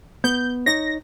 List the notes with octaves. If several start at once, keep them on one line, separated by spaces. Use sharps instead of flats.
B3 G6
D#4 C#5 A#6